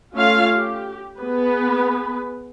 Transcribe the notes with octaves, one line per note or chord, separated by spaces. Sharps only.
A3 C#4 F4 F5
G4
B3 G#4 B4